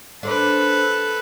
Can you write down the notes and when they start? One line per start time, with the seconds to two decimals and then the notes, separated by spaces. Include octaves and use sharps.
0.23 D4 A4 B4 C5 D5